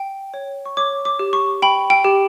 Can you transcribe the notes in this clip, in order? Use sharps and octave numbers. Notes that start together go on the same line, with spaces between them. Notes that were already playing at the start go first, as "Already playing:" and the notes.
Already playing: G5
C#5
C#6
C#5 D6
D6
G4
C#6
G5 B5
G5
G4